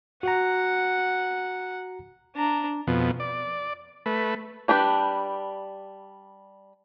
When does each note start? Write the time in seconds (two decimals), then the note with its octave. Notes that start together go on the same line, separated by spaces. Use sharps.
0.23 F#4 F#5 A#5
2.36 D4 A#5
2.87 F2 B2
3.20 D5
4.06 A3 B4
4.68 G3 D4 G4 B4